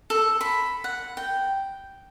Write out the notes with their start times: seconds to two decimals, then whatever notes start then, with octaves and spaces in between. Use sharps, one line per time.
0.10 A4
0.41 B5
0.84 F#5
1.17 G5